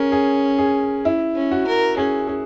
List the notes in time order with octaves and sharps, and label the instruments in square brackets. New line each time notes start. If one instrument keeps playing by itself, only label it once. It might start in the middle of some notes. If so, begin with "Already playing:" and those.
Already playing: [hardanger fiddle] C#4 [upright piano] G#4 A#4
[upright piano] G#4
G#4
E4
[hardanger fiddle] C#4
[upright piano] F#4
[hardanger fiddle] A#4
[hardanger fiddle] C#4 [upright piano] G#4
[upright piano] G#4